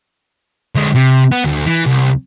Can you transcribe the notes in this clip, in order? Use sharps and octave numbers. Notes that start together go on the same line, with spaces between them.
D3 G#3
C3
B3
D2
E3
C2